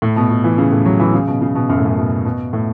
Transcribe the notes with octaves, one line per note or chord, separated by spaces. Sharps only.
A2
B2
B2
E3
C#3
A2
F#3
E3
C#3
B2
C#3
B2
F#2
A2
F#2
B2
B2
A2